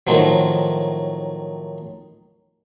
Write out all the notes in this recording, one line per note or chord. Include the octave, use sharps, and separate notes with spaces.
A2 D#3 F3 F#3